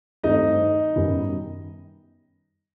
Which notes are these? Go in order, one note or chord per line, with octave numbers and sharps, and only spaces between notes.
G2 D#3 A3 C4 D#4 D#5
F#2 D#3 G3 B3